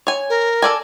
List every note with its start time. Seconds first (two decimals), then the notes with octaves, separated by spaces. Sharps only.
0.07 C#5 G#5
0.30 A#4
0.62 A4 D5 G#5